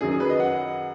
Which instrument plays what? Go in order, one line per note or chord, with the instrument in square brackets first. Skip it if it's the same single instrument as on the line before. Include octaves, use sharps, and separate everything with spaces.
[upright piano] F#2 D#3 F#3 G#4
G#4
B4
D#5
F#5